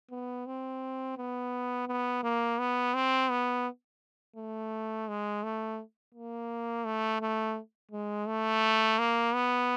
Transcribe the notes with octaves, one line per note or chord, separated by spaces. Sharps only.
B3
C4
B3
B3
A#3
B3
C4
B3
A3
G#3
A3
A#3
A3
A3
G#3
A3
A#3
B3